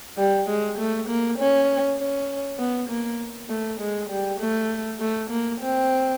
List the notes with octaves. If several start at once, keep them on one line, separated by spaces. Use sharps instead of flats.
G3
G#3
A3
A#3
C#4
C#4
B3
A#3
A3
G#3
G3
A3
A3
A#3
C4